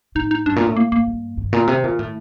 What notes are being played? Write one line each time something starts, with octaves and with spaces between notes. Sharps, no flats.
A2 D#4
D#4
G2 D4
A#2
A2
A#3
G2 A#3
G2
G2 D#3
A#2 D3
C3 D#3
A#2
A2